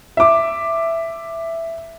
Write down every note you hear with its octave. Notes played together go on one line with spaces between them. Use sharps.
E5 D6